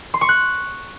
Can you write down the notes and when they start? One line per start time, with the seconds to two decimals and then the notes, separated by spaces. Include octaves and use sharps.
0.14 C6
0.21 C#6
0.29 F#6